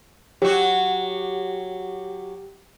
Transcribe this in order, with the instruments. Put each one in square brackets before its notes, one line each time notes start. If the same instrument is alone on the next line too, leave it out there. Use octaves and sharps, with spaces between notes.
[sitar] F#3 F#4 [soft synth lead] G4